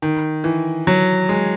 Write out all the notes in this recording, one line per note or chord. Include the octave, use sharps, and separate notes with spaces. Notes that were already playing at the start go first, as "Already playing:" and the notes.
D#3
E3
F#3
G#3